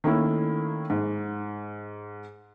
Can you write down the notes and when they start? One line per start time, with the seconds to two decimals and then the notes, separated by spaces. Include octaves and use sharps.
0.04 D#3 A3 A#3 C#4 E4
0.90 G#2